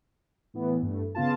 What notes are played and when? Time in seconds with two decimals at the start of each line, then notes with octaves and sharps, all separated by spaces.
0.54 A2 E3 B3
0.82 G2 A3
1.15 C#3 B3 F4 A5